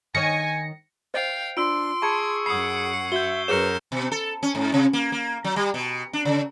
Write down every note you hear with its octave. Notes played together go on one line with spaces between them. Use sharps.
D#3 C#5 G#5 A#6 C#7
C5 D#5 F5 G5
D4 F4 C6 E6 D7
G#4 A5 B5 C#6 G#6 C#7
F#2 F#5 B5 D#6 C7
F#4 E5 G6 G7
F#2 G#4 A#4 B4 C#5 F6 C#7 E7
B2
A4
C#4
G#2
C3
A#3
A#3
F#3
G3
B2
D4
C#3